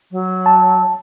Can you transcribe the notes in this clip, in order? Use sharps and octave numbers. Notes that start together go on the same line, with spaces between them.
F#3
A5